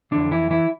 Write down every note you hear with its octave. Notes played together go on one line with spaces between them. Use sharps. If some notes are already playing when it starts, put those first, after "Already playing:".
F2 D3 E3 D4
E3 E4
E3 E4